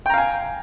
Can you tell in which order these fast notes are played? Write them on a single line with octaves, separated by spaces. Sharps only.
G5 A#5 F5 G#5